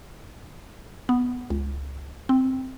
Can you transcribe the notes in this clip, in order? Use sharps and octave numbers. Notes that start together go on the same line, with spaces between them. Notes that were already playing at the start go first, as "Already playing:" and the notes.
B3
C#2
C4